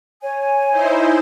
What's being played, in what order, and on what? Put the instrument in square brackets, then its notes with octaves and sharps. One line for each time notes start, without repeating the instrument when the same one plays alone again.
[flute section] C#5 G#5
[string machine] D#4 E4 C5